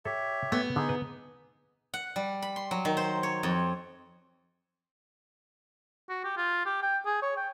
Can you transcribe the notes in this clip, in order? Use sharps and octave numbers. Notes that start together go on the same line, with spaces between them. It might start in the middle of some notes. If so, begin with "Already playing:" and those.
G4 A4 C#5 E5
A3 B3
D3 D#4 G#4
B4
F#5
G3
B5
C6
F#3
D#3
C5
C#5
F2
F#4
G4
F4
G4
G5
G#4
C#5
G5